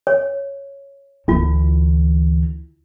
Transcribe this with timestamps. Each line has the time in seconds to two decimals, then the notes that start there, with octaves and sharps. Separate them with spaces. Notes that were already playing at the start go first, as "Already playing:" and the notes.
0.07 C#5
1.28 D2 E3 E4 F4